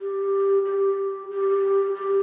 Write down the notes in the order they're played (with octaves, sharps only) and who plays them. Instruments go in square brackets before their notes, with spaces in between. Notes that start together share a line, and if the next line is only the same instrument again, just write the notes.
[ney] G4
G4
G4
G4